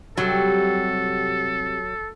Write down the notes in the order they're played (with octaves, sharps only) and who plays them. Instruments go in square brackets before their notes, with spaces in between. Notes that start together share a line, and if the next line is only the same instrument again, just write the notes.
[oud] C3 G3 [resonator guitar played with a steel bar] F#3 [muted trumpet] A4